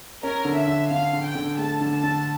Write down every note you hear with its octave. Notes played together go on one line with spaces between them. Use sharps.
C#4 A#4
D3
E5
D3
D3 F5
D3
G5
D3
A3 A5
D3
A5
D3